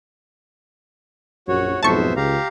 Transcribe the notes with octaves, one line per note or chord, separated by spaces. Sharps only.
A#1 F#2 F#4 C#5
B1 F2 G#2 B3 C5 E5 A5 C#6
C#2 G4 F5 A#5